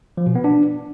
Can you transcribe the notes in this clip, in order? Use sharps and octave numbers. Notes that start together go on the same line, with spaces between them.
F3
B2
B3
D4